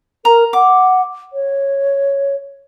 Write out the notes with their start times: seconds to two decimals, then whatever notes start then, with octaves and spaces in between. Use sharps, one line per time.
0.25 A#4 A#5
0.53 F#5 D6
1.33 C#5